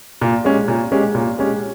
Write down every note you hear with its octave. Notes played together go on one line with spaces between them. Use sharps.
A#2
G#3 C#4 G4
A#2
G#3 C#4 G4
A#2
G#3 C#4 G4